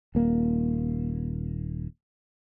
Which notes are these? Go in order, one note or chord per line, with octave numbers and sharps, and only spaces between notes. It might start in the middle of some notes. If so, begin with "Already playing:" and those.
D#1 A#3